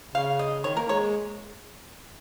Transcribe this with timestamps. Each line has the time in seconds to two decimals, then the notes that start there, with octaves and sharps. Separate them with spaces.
0.15 C#3 F5
0.39 D#5
0.64 D#3 C#5
0.77 A#3 A#4
0.89 G#3 C#5